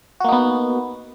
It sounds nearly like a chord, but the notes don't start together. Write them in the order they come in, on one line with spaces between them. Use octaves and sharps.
F#4 A#3 D#4 B3